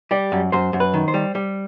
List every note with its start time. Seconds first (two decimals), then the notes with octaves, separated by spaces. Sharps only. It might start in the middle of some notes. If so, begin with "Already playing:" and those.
0.11 G3 D5
0.32 F#2
0.52 F#2 C5
0.73 F#2
0.80 B4
0.94 D#3
1.08 C5
1.14 G3
1.35 G3